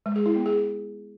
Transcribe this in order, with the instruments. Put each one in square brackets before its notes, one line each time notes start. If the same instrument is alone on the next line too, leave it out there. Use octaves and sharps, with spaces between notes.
[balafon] G#3
G#4
E4
B3
G#4